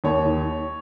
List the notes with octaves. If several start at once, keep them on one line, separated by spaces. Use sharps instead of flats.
D#2 C#5
D#3